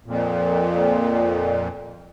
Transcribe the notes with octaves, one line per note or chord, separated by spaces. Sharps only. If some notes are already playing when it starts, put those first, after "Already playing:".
F2 A#2